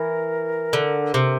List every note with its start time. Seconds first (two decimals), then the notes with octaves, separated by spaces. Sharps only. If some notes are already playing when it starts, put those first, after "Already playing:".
Already playing: E3 A#4
0.73 D3
1.14 C3